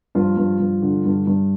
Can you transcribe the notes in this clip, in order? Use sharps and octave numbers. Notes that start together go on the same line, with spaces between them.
G2 F3 F4
G2
G2
D3
G2
G2